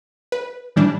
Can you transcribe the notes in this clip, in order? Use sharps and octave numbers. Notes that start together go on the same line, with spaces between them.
B4
A2 E3 G3 D4